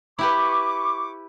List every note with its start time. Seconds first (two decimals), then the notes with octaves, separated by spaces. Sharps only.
0.19 E4 G4 B4 C#6 D6